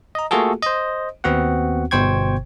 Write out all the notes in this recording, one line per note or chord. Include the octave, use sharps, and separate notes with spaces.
D#5 A#5
A3 A#3 F4 F#4 G#4 A4
C5 D#5
D#2 B3 C4 F#4 F#5
G1 B2 C5 G5 C#6 G#6